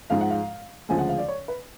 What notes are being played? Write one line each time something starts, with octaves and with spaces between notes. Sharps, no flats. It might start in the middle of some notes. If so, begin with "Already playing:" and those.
G#2 F3 G#3 F5
F#5
F5
D2 C#3 F3 G#3 G#5
F#5
F5
D5
C#5
B4